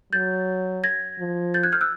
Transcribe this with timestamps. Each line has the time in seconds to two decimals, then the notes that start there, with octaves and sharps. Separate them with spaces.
0.13 F#3 G6 A6
0.84 G#6 A#6
1.19 F3
1.54 G6 A6
1.63 F#6 G#6
1.72 F6 G6
1.81 E6 F#6